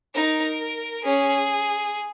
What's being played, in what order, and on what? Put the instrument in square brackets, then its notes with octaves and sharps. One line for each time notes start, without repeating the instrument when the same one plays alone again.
[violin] D#4 [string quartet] A#4
[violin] C#4 [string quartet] G#4